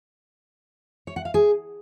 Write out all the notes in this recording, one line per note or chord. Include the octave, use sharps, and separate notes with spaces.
C#5
F#5
F5
G#4